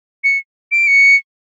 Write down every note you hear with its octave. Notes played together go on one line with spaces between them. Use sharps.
C#7
D7
C#7